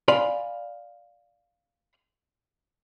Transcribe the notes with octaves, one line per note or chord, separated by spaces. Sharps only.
D5 F5 G#5 B5 C6